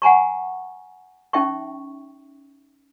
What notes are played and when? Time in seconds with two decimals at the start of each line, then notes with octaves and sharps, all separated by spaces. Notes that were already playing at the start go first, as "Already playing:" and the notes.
0.02 F#5 G#5 A#5 C#6
1.33 C#4 D#4 E5 G5 C#6